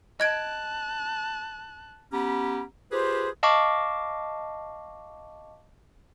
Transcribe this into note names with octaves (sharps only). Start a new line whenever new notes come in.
D#5 A5 F#6 G#6 D7
B3 C#4 G4 A#5 B5
F4 G4 G#4 B4 C5
D#5 F5 A5 C#6 D6